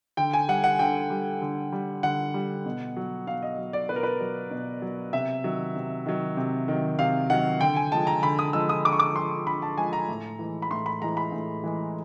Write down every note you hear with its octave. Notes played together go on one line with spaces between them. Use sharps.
D3 G5
G#5
G3 F#5
F#5
D3 G5
G3
D3
G3
D3 F#5
G3
B2
F#3
B2 F5
D#5
F#3
D5
B2 B4
A#4
B4
F#3
B2
F#3
C3 E5
D#3 F#3
C3
D#3 F#3
C3
D#3 F#3
C3 F5
D#3 F#3 F#5
D3 G5
G#5
F3 G#3 A5
A#5
D3 B5
D#6
F3 G#3 E6
D#6
D3 D6
C#6
D6
F3 G#3 C6
D3 B5
A5
F3 G#3 G#5
A#5
A2
E3 G#3
B5
A2 C6
B5
E3 G#3 A#5
B5
A2
E3 G#3